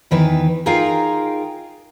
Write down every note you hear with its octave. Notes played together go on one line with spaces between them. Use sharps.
E2 D#3 E3 B4
D#4 F4 G#4 A#4 F5 G5